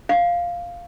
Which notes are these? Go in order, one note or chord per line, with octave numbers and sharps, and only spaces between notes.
F5